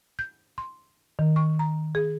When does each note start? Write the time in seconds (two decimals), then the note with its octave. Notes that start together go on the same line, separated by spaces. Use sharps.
0.19 G6
0.58 C6
1.19 D#3
1.36 C#6
1.59 A#5
1.95 G#4